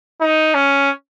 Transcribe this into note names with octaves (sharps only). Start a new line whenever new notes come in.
D#4
C#4